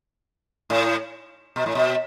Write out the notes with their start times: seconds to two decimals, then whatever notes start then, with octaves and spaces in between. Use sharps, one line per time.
0.70 A2
1.56 B2
1.66 A2
1.75 B2